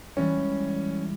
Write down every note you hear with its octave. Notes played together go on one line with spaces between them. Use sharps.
E3 G3 G#3 C#4